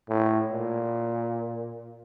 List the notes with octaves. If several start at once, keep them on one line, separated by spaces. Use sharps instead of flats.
A2
A#2